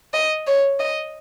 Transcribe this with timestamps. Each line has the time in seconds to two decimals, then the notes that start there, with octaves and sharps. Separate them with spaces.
0.13 D#5
0.47 C#5
0.79 D#5